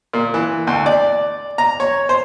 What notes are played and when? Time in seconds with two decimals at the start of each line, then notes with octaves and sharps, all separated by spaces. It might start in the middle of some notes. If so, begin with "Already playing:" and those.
0.13 A#2
0.34 E3
0.67 D2
0.86 D5
1.58 A#5
1.80 C#5
2.09 C5